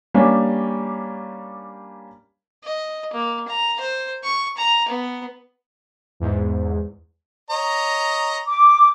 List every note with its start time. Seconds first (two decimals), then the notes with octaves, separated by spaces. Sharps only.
0.14 G3 A#3 C#4 D4 G4
2.64 D#5
3.13 A#3
3.49 A#5
3.80 C5
4.24 C#6
4.58 A#5
4.88 B3
6.20 E2 G#2
7.50 C#5 D#5 A#5
8.48 D6